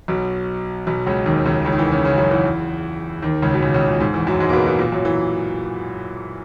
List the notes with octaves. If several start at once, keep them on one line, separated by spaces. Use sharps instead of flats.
B1 B2
B1 B2
C#2 C#3
D#2 D#3
C#2 C#3
C#2 C#3
D#3
E2 E3
C#3 C#4
C#3 C#4
F#2 F#3
E2 E3
D#2 D#3
C#2 C#3
B2
C#2 C#3
C#2 C#3
A#2
G#2
E2 E3
F#2 F#3
G#2 G#3
A#3
B2 B3
B2 B3
A#2 A#3
F#2 F#3
E3